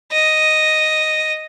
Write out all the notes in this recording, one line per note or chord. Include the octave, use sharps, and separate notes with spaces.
D#5